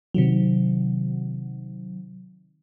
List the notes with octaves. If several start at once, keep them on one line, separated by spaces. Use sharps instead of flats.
C3 D#3 F#3